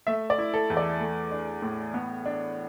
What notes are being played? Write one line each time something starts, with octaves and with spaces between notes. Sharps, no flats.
A3 E5
D5
E4
A4
E2
D5
A3
D4
A2
B3
D4